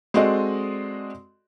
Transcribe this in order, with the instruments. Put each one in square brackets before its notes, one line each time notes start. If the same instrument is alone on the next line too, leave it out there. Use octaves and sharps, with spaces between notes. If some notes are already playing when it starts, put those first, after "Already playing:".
[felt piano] G#3 C4 F#4 A4 D5 D#5